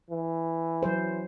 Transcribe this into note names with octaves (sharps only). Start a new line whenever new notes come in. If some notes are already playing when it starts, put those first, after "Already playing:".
E3
F#3 C5